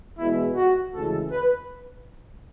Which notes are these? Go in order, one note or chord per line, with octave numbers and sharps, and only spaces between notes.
E2 B2 G#3 E4
F#4
D2 C#3 E3 G#3 A4
B4